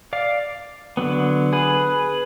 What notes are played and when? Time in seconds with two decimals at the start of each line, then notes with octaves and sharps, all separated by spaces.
0.13 D5 F5
0.97 D3 F#3 B3
1.53 G#4 B4